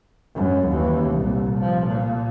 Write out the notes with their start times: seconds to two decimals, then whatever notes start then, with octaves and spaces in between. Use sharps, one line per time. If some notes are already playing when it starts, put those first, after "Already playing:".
0.36 F#2
0.69 D#2 E3
1.14 C2 A#2
1.60 F3
1.88 A#2